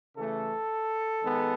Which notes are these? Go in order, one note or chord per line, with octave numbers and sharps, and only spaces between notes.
C#3 E3 A3 A4
D#3 G#3 B3